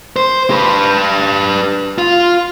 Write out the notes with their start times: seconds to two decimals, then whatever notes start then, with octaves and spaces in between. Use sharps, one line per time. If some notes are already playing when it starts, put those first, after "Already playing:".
0.16 C5
0.50 G4 B4
1.98 F4